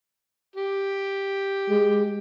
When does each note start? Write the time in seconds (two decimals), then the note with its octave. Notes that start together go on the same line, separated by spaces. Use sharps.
0.56 G4
1.70 G#3